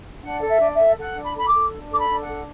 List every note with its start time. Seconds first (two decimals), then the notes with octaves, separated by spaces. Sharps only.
0.23 D4 F#5
0.41 A4
0.48 E5
0.60 D4
0.73 E5
0.78 A4
0.96 A4 F#5
1.16 D4
1.22 B5
1.34 A4 B5
1.47 D6
1.53 A4
1.72 D4
1.89 A4 D6
1.97 B5
2.09 D4
2.21 F#5
2.27 A4